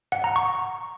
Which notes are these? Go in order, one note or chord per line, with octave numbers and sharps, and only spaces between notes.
F#5
A#5
C#6